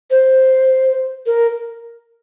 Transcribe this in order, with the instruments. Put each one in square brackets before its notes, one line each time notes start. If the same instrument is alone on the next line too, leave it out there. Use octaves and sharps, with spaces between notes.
[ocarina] C5
A#4